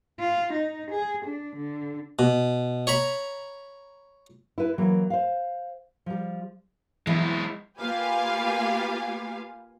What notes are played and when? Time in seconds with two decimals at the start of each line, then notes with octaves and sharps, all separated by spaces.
0.20 F4
0.53 D#4
0.91 G#4
1.25 D4
1.56 D3
2.19 B2
2.87 C#5 A#5 B5
4.58 E4 B4
4.78 E3 F#3 A#3
5.10 C5 F5
6.06 F3 G3
7.07 E3 F#3 G#3 B3 E4
7.80 A#3 F4 G4 B4 F5 G#5